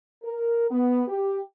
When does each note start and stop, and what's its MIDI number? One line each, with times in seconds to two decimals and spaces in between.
0.23 0.66 70
0.70 1.01 59
1.08 1.39 67